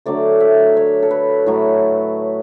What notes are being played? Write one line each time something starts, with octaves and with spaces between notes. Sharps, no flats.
D3 F#3 A3 D5
E5
C#5
A4
B4
A2 F#3 A3